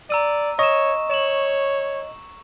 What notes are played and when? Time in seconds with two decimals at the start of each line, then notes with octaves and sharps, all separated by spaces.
0.10 D5 A#5 E6 D#7
0.59 C#5 D#5 C#6 E7
1.11 C#5 E7 F#7